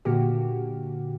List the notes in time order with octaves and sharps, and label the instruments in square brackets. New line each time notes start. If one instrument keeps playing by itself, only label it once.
[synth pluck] A#2 D3 A#3 F#4 G4